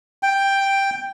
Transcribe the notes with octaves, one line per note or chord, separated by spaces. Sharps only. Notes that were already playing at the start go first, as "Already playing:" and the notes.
G5